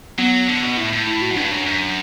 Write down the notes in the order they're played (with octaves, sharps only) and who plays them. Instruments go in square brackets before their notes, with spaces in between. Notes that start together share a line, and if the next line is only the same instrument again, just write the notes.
[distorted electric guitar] F#3 [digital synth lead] B3
[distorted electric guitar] D3
B2
[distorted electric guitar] A2 [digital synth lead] E4
[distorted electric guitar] A2
[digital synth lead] E4
F#4
[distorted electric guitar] F#2
[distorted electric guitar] G2 [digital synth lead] D4
[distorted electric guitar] F#2
F#2